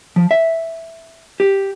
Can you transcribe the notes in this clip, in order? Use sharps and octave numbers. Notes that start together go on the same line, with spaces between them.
F3
E5
G4